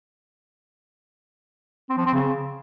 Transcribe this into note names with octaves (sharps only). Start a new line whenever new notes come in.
C4
F3
C4
C#3